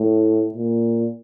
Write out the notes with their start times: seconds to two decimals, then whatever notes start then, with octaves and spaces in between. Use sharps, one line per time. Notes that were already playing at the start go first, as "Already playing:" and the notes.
Already playing: A2
0.54 A#2